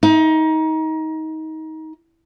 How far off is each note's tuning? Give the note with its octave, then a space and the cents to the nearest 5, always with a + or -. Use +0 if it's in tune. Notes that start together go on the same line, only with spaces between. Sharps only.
D#4 +25